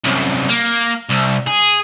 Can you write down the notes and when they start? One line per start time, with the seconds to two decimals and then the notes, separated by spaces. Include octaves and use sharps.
0.04 C2 F#2
0.48 A#3
1.09 C2
1.47 G#4